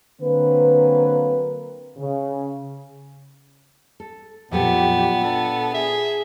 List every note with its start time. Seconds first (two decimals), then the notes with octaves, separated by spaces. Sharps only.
0.21 D3 F#3 A#3 C4 B4
1.97 C#3
4.00 A4
4.51 F2 A#2 F#3 B3 G4 A4
5.21 D4 A4
5.74 G#4 E5